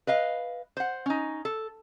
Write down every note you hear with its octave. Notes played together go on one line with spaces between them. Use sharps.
B4 D#5 F5
C5 F#5
C#4 D#4
A4